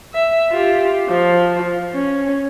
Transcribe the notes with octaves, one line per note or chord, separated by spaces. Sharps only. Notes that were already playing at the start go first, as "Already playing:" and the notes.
E5
F4 G4
F3
C#4